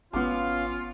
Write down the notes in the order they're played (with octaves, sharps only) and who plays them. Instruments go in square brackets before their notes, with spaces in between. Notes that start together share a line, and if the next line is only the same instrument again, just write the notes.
[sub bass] G#1 [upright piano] B3 C6 D6 [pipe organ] C#4 F5 [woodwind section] F4